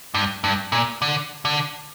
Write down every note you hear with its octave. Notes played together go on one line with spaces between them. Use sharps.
G2
G2
A#2
D3
D3